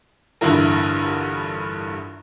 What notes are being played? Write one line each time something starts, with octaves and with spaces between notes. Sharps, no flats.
A1 G2 D3 E4 F4 A#4